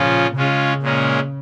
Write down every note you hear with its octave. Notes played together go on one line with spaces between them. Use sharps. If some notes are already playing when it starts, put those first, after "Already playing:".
Already playing: A#2 C#3 F3 C#4 F4
C#3 G#3 C#4 F4
A#2 G#3 C#4 A#4